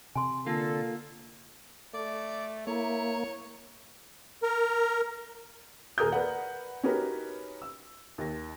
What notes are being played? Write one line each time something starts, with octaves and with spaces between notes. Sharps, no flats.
C3 G#5 C6
D3 A#3 F4 A4
A3 D5
A#3 E4 C#5
A#4
D#1 G#4 A#4 D#6 G6
A#4 B4 D5 F#5
C#4 D#4 F#4 G4 A#4 B4
E6
D#2 A#6